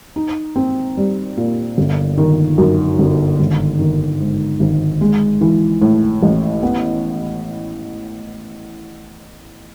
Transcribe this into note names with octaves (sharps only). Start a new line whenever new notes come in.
D#4
C4
G3
A#2
G1
D#3
F#2
G1
G#1
D#3
G#2
G#1
G#3
E3
A2
A1
B3